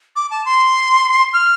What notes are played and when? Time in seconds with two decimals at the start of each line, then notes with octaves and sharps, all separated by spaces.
0.16 D6
0.30 A5
0.45 C6
1.33 F6